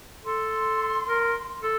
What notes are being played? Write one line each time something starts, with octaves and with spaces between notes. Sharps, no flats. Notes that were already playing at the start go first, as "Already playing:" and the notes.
A4 C6
A#4
A4